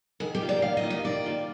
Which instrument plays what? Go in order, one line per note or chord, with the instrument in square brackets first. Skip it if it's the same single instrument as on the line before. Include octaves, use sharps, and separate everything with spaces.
[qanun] D#3 [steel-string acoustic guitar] G#4
[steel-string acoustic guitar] G4
[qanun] G3 A#3 F4
[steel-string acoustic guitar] D5
[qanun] D#3 [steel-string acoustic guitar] F5
[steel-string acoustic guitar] D#5
[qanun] G3 A#3 F4
[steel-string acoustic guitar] D#5
[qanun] D#3 [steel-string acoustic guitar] D5
[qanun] G3 A#3 F4